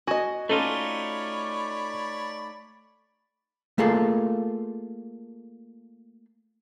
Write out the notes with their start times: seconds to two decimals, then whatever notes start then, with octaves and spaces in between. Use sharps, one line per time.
0.07 F#4 D#5 G#5
0.49 A3 C#4 D#4 F4 A4 C#5 D5 B5
3.78 A3 A#3 F4 G#4 A4